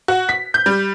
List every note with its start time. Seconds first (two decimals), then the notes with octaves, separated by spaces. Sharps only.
0.08 F#4
0.29 B6
0.54 G6
0.66 G3